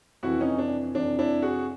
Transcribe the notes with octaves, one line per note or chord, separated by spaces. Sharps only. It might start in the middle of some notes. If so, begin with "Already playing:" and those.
F2 C3 E3 E4 F#4
C#4 D#4
D4
F2 C3 E3 D4
D4 E4
F#4 G#4